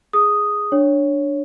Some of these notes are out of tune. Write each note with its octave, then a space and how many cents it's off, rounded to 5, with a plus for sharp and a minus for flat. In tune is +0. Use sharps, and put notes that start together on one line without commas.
G#4 +0 D#6 +0
D4 +0 C#5 +0